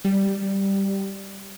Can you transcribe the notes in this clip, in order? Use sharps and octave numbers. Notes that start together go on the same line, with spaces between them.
G3